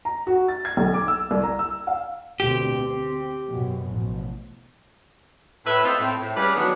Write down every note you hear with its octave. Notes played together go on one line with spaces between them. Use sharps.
A#5
F#4
A6
G#6
B1
D6
E6
C2
A#5
E6
F5
D2 B2 C4 G4
C4
F#2 B2
A1 B2 F3
A2 B4 E5
C4 F4 A4 C5 D#5 E5
A2 A3 C4
A2
G3 C#4 G#4 B4 D5 F5
D3 D#3 F#3 A3 B3 D4